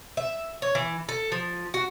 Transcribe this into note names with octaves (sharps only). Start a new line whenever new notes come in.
E5
C#5
E3
A4
F3
F#4